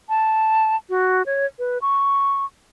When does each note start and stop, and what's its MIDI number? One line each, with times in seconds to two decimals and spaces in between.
0.09 0.76 81
0.90 1.23 66
1.26 1.46 73
1.59 1.78 71
1.82 2.45 85